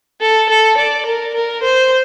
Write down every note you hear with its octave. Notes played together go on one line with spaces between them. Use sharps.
A4
A4
D5
A#4
A#4
C5